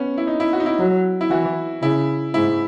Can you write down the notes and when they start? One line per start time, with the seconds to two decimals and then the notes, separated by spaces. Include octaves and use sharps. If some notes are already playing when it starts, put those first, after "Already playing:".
Already playing: B3 C#4
0.18 E4
0.27 D#4
0.40 E4
0.53 F#4
0.60 D#4
0.66 E4
0.79 F#3
1.21 E4
1.30 E3 F#4
1.82 C#3 E4
2.34 G#2 E4